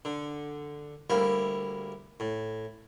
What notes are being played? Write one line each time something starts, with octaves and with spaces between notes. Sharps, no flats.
D3
D2 G3 A#3 E4
A2